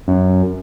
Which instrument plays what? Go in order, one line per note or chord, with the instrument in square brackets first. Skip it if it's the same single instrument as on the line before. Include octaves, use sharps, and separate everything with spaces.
[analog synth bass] F#2